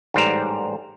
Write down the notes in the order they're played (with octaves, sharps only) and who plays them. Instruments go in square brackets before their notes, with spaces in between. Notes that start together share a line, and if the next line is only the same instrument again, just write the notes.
[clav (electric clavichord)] A1 G#2 G3 C5 D5 A#5